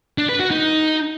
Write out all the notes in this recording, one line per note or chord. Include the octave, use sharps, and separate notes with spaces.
D4
B4
F#4
D#4